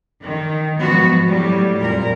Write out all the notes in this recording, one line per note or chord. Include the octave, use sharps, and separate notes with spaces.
D#3
G#2 F3 F#3 B3 F#4
A2 F#3 G3
F2 A#2 A#4